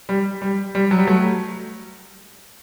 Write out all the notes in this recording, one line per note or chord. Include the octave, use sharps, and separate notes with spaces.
G3
G3
G3
F#3
G3
F#3 A3